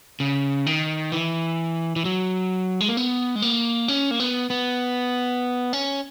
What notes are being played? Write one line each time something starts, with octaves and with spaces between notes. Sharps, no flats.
C#3
D#3
E3
E3
F#3
G#3
A#3
B3
G#3
A#3
C#4
A#3
B3
B3
C#4